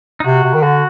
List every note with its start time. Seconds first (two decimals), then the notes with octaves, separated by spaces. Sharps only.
0.20 D#4
0.24 C3 F#4
0.44 C3
0.54 D#3
0.63 D3 F#4